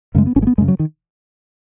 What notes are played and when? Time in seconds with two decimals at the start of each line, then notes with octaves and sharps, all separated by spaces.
0.15 F#2 C#3 G#3
0.27 B3
0.36 G#1 C#4
0.42 G#3
0.47 B3
0.58 F#2 G#3
0.61 C#3
0.68 F#3
0.79 D#3